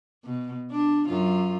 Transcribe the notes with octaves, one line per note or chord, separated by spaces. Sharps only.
B2
D4
F#2 F4